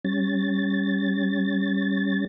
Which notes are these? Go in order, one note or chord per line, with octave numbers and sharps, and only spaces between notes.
G3 C#4 A6